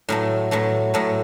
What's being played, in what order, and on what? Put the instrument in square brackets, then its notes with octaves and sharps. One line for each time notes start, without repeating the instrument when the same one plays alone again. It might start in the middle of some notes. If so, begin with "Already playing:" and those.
[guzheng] A2 F#3 A3
A2 F#3 A3
A2 F#3 A3